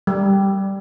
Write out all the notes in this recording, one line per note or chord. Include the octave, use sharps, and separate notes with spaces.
G3